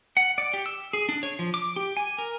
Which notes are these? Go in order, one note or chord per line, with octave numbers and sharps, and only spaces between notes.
F#5
D5
G4
E6
G#4
D4
C#5
F3
D6
G4
G#5
A#4